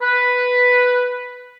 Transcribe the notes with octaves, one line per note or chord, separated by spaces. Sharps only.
B4